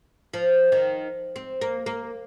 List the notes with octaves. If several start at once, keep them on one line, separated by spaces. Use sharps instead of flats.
F3
D#3
C4
A#3
A#3